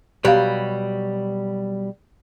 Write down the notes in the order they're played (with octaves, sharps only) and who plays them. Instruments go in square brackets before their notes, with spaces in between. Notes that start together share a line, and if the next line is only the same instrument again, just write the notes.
[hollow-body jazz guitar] B2 F#3 G3 [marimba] G4 F5